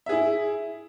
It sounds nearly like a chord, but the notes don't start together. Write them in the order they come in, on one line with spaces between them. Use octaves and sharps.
E5 G#4 E4